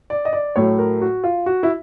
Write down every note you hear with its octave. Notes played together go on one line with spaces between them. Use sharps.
D5
D#5
D5
A2 F#3 A3 C#5
A#4
F#4
F4
F#4
E4